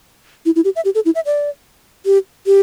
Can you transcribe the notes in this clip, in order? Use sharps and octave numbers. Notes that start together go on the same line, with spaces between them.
E4
E4
G4
E5
G4
A4
E4
E5
D5
G4
G4